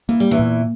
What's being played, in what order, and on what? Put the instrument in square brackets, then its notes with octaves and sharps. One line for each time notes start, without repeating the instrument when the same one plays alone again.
[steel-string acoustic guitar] E3 [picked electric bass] A#3
[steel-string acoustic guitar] G3
E2 E3
[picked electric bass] A#2